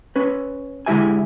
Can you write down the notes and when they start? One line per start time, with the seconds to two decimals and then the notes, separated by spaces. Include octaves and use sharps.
0.16 C#4 B4
0.86 D3 G#3 E4 G4 E5 G#5